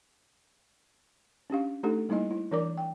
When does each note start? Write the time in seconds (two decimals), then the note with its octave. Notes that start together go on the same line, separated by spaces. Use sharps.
1.50 C#4 D4 G4 F5
1.83 A3 D4 D#4 G4 A4
2.09 G3 A#3 D#4 E4 D#5
2.31 E4
2.51 E3 D4 A#4 D5 D6
2.77 G5